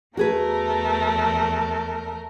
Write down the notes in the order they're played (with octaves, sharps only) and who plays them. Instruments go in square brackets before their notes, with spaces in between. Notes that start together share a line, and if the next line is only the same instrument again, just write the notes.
[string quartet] E2 A3 A#4 [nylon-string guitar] F#4 G#4 B4